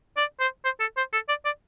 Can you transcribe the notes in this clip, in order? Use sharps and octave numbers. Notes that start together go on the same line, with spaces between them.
D5
C5
C5
A4
C5
A4
D5
D5